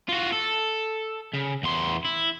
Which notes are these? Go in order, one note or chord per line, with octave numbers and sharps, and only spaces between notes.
F4 F#4
A4
C#3
E2 C6
E4